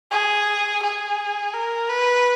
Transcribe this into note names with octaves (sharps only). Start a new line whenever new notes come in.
G#4
G#4
A#4
B4